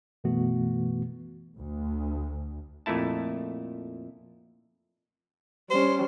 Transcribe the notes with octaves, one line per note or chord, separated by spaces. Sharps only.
F#2 B2 E3 A3 B3 F#4
D2
F2 A#2 A3 E4 A5
G3 C#4 C5